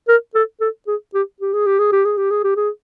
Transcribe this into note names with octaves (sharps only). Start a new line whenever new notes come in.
A#4
A4
A4
G#4
G4
G4
G#4
G4
G#4
G4
G#4
G4
G#4
G4
G#4